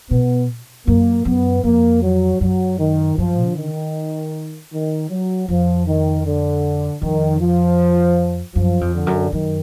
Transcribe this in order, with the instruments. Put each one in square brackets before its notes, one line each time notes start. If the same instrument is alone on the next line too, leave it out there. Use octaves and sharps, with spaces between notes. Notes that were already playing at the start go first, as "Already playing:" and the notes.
[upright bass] B2 [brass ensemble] B3
[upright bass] F#2 [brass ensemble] A#3
[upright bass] F#2 [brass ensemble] B3
[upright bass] F2 [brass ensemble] A#3
[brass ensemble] F#3
[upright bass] F#2 [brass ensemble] F#3
[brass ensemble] D#3
[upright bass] F#2 [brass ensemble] F3
[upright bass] D3
[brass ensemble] D#3
D#3
F#3
[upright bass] F2 [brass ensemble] F3
[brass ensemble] D#3
D3
[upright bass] F2 [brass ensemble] D#3
[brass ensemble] F3
[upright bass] F#2 [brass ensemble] F3
[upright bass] F2
[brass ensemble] D3
[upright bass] F#2
[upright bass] F#2 [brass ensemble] D#3